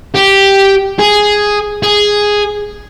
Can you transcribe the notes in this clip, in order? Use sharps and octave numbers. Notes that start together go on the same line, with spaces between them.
G4
G#4
G#4